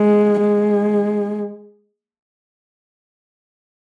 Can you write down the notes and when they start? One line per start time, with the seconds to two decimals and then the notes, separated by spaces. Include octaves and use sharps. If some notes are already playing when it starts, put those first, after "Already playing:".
Already playing: G#3
0.39 G#3